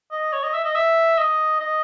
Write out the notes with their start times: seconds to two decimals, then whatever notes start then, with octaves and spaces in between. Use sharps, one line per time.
0.11 D#5
0.32 C#5
0.43 D#5
0.54 E5
0.64 D#5
0.75 E5
1.18 D#5
1.60 D#5